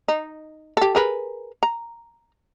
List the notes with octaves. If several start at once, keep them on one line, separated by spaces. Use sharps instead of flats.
D#4
G4 A4
G#4 A#4 B4
A#5